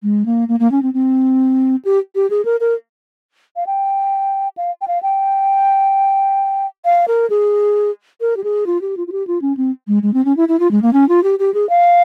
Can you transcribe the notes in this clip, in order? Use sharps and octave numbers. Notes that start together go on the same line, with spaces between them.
G#3
A#3
A#3
A#3
C#4
C4
C4
G4
G4
G#4
A#4
A#4
F5
G5
F5
G5
F5
G5
F5
A#4
G#4
A#4
G4
G#4
F4
G4
F4
F4
G4
F4
C#4
C4
G#3
G#3
C4
C#4
E4
E4
F4
G#3
A#3
C#4
F4
G4
G4
G#4
F5